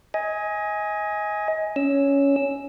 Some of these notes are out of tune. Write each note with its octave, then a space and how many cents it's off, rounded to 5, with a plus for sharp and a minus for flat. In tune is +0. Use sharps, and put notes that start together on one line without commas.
D#5 +30 G#5 +0
C#4 +10 E6 +0